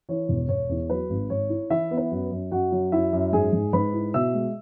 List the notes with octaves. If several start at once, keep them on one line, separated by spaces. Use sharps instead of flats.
E3 C#5
E1
E1 C#5
E2
F#3 B4
G#1
G#1 C#5
E4
E3 E4 E5
B3
B4
F#2
F#2
F#2 F#4 F#5
F#3
F#2 E4 E5
F#2
G#2 G#4 G#5
G#2
G#2 B4 B5
E4
B2 E5 E6
G#3